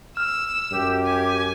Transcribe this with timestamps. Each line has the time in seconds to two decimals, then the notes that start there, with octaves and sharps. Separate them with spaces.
0.17 E6 F6
0.71 F#2 G4
1.05 G#5